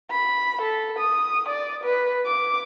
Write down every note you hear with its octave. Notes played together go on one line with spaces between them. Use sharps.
B5
A4
D#6
D5
B4
D6